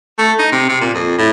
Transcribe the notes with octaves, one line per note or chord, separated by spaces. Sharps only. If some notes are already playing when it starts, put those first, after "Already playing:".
A3
D#4
C3
C3
A#2
F2
A2